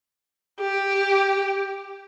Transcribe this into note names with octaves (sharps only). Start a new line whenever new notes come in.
G4